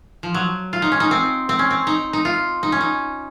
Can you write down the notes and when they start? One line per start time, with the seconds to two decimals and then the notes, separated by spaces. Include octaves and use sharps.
0.23 F3
0.34 F#3
0.73 F4
0.82 D#4
0.92 C#4
1.00 D#4
1.11 C4
1.49 C4
1.59 C#4
1.71 C4
1.87 D#4
2.13 D#4
2.25 F4
2.63 D#4
2.72 C#4
2.81 D#4